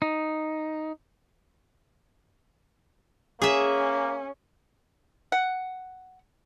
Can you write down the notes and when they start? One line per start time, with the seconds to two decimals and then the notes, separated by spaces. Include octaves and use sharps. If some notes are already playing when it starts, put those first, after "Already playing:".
0.02 D#4
3.42 A#3 C#4 G#4 E5
5.32 F#5